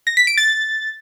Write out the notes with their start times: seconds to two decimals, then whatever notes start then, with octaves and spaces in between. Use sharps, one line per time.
0.07 A#6
0.17 B6
0.27 D7
0.37 A6